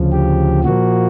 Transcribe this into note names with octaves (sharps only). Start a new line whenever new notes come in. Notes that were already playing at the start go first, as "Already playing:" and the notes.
Already playing: D2 C#3 F3
G4
A#2 F3 A#3 F#4